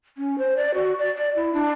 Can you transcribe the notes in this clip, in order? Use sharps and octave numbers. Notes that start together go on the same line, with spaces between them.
C#4
C5
D5
F#4
D5
D5
E4
D4